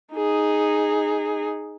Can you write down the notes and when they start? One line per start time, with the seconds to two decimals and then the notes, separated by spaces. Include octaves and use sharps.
0.15 D#4 G#4